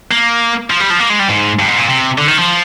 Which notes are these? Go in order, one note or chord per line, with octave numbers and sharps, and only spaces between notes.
A#3
F3
G3
F3
A#3
G#3
G3
G#2
G2
G#2
A#2
C3
D3
D#3
F3